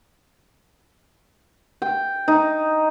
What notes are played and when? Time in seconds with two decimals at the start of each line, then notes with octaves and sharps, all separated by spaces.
1.82 G5
2.28 D#4